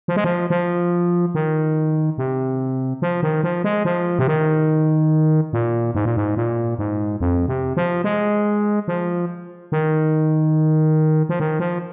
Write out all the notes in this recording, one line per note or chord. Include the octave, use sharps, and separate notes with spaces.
F3
G#3
F3
F3
D#3
C3
F3
D#3
F3
G#3
F3
C3
D#3
A#2
G#2
A#2
G#2
A#2
G#2
F2
C3
F3
G#3
F3
D#3
F3
D#3
F3